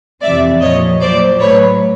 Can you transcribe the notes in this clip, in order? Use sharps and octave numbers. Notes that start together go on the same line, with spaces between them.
F2 C3 E3 G3 D5 E5
A#2 F3 C#5 D#5
A#2 F#3 C5 D5
A2 F#3 B4 C#5